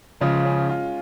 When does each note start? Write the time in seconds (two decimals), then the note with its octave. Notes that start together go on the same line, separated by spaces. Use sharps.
0.20 C#3 F3 G#3
0.45 C#4
0.69 F4